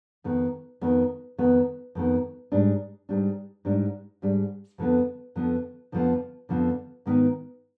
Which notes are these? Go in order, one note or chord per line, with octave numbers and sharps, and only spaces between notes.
F2 D#3 B3
F2 D#3 B3
F2 D#3 B3
F2 D#3 B3
G#2 G3 D4
G#2 G3 D4
G#2 G3 D4
G#2 G3 D4
F2 D3 F3 B3
F2 D3 F3 B3
F2 D3 F3 B3
F2 D3 F3 B3
G#2 D#3 B3 D#4